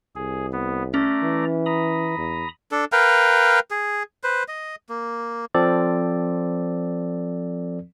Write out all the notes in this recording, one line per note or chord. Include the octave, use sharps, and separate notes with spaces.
C2 G#4
B3
A3 C#4 D5 A#5
E3
A#5 B5 D#6
E2
D4 A4
A#4 B4 F5 G5
G#4
B4 C5
D#5
A#3
F3 C4 A4 D5